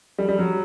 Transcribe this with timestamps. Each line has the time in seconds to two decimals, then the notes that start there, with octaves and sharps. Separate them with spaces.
0.18 G3
0.29 G3
0.39 F#3